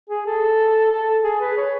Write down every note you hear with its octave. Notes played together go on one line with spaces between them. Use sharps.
G#4
A4
A4
G#4
B4
C#5